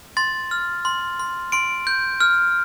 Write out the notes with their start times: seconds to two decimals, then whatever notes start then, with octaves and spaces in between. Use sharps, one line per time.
0.17 C6 A6
0.51 F6
0.85 C6
1.20 C6
1.52 C6 D7
1.87 G6
2.20 F6